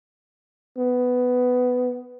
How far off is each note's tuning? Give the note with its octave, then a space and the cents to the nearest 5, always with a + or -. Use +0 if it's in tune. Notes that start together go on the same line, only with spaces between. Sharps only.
B3 +10